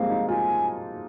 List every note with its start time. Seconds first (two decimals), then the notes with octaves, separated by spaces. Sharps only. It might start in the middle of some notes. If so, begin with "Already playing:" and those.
Already playing: F3 G3 G#3 A#3 C4 F5
0.10 D#4
0.28 F4 G#5